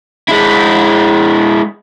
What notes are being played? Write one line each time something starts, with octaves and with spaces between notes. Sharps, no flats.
G#3 E4